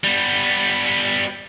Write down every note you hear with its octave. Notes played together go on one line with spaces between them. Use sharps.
G3 B3